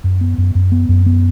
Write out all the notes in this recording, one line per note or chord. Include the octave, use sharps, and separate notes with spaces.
F#2
B3
F#2
F#2
B3
F#2
B3